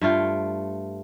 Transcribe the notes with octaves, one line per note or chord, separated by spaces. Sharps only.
G2 A3 F4 G5